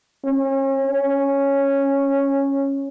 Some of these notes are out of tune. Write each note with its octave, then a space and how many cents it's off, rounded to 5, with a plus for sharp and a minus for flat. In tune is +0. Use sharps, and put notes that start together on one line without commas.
C#4 -40
C#4 -5